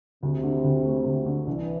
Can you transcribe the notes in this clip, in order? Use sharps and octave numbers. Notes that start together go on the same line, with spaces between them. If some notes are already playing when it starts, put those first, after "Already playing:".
D2 C3
D3
D2
A3
D2
D3
C2 E3